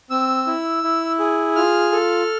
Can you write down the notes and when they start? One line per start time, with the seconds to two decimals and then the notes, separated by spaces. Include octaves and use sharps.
0.10 C4 E6
0.47 E4
0.84 E4
1.19 G#4
1.56 F4 F6
1.92 A4